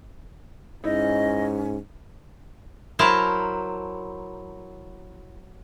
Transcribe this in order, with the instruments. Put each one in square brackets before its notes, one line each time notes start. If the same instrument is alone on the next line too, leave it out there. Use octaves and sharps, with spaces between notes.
[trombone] G#2 [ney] C#4 [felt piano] D#4 E4 [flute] D#5
[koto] F#3 E4 A#4 C5 A5 A#5